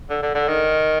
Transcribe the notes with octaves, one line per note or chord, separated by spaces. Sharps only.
D3
D3
D3
D#3